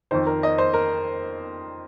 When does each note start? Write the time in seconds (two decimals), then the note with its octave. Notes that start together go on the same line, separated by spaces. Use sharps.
0.11 F2 D#3 C5
0.27 A#4
0.43 D#5
0.58 C5
0.74 A#4